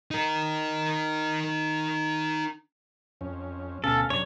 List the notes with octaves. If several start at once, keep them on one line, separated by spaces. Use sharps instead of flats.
D#4 A#4
F2 C#4
D2 B2 C#4 A4 F5
F#2 C3 D4 C#5